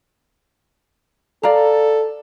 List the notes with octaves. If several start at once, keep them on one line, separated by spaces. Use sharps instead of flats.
A4 D5 F5 A#5